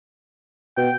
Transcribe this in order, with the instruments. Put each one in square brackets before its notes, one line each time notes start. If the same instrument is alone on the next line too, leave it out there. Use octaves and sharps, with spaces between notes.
[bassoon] B2 [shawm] G5